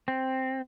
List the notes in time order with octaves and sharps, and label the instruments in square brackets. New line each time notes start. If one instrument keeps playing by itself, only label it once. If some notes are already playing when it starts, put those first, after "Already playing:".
[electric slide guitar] C4